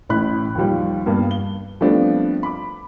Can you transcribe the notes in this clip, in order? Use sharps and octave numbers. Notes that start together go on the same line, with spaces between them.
A1 A2 C#4 B5 F#6
D#2 D#3 F3 G3
G2 G3 A#3 B3
G7
F3 G3 A3 B3 C4 D4
B5 D6